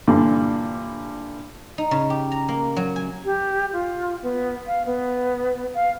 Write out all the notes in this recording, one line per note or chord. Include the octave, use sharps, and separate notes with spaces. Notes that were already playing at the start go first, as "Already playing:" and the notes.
G2 A#2 D3 E3
D#4
C#3
G4
A#5
A#3
F#3
G#5
G4
F4
B3
F5
B3
F5